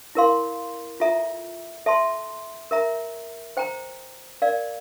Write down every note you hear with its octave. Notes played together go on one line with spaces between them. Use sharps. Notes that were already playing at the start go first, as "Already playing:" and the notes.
E4 A#4 F5 C6
F4 A4 E5 A#5
A4 E5 A5 C6
A#4 E5 A#5
C5 G5 A#5
A#4 D5 F5